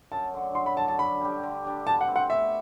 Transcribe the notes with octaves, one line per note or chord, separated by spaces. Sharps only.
F#2 A5
D3 F#3
F#2 C6
B5
D3 F#3 A5
A5
D3 B5
G3 D4 G4
D3
G3 D4 G4
B2 A5
F#5
A3 C4
F#5
B2 E5